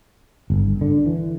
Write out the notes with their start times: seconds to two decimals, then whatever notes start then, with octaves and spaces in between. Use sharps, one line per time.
0.50 G1
0.81 D3
1.06 E3